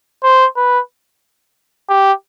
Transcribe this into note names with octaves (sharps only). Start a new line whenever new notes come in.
C5
B4
G4